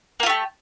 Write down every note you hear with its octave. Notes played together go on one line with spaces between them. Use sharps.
A3 A#3 F4 G4